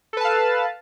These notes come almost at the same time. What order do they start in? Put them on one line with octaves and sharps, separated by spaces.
A4 B4 A5 F5